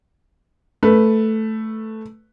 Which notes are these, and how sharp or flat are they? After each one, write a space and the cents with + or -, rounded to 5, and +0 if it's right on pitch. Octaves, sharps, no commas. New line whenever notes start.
A3 +0 B4 +0